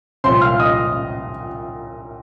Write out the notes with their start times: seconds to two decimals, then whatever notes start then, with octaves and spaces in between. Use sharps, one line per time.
0.24 C2 A#2 F3 C5 C6
0.41 F5 F6
0.59 D#5 D#6